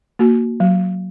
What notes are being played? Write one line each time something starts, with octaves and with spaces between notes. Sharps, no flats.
A#3 F#4
F#3